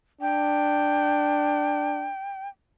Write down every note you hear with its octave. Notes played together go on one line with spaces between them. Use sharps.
D4 G5